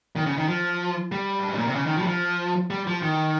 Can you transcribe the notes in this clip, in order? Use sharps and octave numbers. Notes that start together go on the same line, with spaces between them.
D#3
C#3
D#3
F3
G3
G2
G#2
A#2
C3
C#3
D#3
F3
G3
F3
G3
F3
D#3